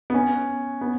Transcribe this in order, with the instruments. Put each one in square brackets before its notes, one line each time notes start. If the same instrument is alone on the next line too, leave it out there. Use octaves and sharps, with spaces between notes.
[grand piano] B3
C#4
B3